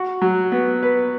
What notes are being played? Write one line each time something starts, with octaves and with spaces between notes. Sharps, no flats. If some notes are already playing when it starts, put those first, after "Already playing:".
Already playing: F#4
F#3
B3
B4